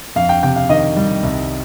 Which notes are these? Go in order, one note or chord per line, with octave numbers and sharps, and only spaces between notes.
F2 F5
G5
C3 G5
F5
D#3 D#5
G3
C2